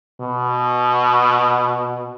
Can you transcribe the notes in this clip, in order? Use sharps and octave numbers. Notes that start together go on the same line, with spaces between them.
B2